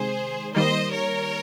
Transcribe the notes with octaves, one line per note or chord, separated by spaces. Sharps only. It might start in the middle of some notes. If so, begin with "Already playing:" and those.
Already playing: C3 D#3 G#3 G#4 C5
D#3 G3 A#3 C5 D#5
A#4 C#5